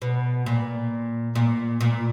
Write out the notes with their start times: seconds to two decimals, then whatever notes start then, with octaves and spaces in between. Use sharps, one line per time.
0.02 B2
0.46 A#2
1.35 A#2
1.81 A#2